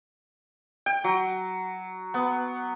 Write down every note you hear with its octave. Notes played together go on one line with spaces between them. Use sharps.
G5
F#3
B3